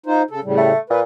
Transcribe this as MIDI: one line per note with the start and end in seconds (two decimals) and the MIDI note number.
0.06 0.22 63
0.06 0.22 65
0.06 0.22 72
0.31 0.40 49
0.31 0.40 69
0.44 0.72 45
0.44 0.72 49
0.44 0.72 55
0.57 0.79 57
0.90 1.03 46
0.90 1.00 71